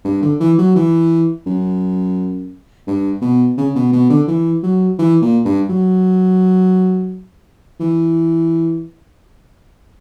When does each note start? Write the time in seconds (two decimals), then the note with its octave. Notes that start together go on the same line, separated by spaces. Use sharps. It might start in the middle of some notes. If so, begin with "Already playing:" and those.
0.05 G2
0.22 D3
0.40 E3
0.58 F#3
0.76 E3
1.46 F#2
2.87 G2
3.22 B2
3.57 C#3
3.75 B2
3.92 B2
4.10 D3
4.27 E3
4.63 F#3
4.99 E3
5.22 A#2
5.45 G2
5.69 F#3
7.80 E3